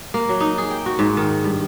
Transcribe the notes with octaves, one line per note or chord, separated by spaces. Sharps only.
A#3
F#3
D#4
G#4
G5
F#4
G#2
D#3
G2